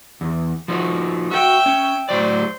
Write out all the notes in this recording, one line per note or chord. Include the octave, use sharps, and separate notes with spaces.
E2
F3 D#4 F#4
F#4 E5 G5
C#4
A2 F#3 C5 D5